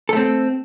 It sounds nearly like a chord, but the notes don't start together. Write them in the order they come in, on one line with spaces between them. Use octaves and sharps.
A4 A3 C4